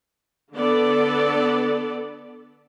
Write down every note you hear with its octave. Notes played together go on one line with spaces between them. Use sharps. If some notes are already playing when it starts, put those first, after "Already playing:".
D3 B3 A4 D5